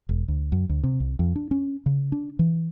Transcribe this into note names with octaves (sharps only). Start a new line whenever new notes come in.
E1
D2
F#2
D2
C3
C2
F2
D4
C#4
C#3
D4
E3